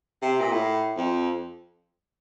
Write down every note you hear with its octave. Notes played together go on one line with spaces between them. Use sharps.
C3
A#2
A2
F2